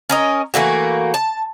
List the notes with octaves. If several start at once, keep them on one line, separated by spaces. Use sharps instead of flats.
C#4 A#4 D#5
E3 A3 A#3 F#4
A5